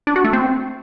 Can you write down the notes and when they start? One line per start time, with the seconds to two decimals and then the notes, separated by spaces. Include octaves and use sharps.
0.07 D4
0.16 F#4
0.25 A3
0.33 C4